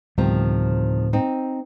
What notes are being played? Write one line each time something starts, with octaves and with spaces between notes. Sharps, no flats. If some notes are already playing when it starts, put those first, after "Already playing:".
D2 A2 C3 D#3 F3 G3 B3
C4 D#4